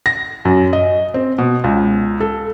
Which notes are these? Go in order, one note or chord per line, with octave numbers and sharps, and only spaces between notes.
A#6
F#2
D#5
C4
B2
C#2
A4